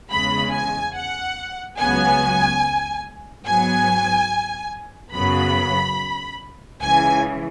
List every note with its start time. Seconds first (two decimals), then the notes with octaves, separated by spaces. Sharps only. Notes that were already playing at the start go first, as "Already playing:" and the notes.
0.11 E2 C#3 G#3 B5
0.53 G#5
0.95 F#5
1.78 C#2 C#3 F#3 B3 G#5
3.46 G#2 F#3 B3 G#5
5.13 F#2 C#3 F#3 B3 B5
6.81 C#2 C#3 E3 G#5